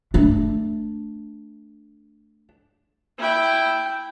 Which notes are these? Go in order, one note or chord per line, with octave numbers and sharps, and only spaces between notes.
A3 D4
E4 G5